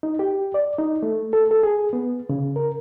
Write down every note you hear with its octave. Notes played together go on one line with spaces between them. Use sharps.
D#4
G4
D5
D#4
A3
A4
A4
G#4
B3
C#3
A#4